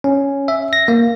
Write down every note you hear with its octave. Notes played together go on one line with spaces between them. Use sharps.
C#4
E5
A#6
A#3